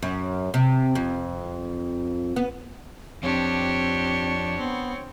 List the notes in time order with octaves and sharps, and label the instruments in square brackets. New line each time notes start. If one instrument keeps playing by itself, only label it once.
[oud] F#2
C3
F2
B3
[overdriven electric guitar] F2 [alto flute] C4 [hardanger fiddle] D4 G4 [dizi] C#5
[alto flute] B3 [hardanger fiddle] C4